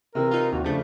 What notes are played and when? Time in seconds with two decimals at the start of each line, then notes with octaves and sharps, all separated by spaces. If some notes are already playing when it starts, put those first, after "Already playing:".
0.15 C3 E3 A#4
0.31 D#4 F4
0.53 D#2 F#4
0.64 C#3 F3 A3 D4